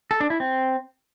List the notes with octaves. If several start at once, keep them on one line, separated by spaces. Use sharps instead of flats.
A4
D4
E4
C4